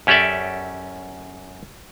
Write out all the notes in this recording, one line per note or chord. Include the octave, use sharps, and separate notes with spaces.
F#2 C#4 G4 A4 D5 E5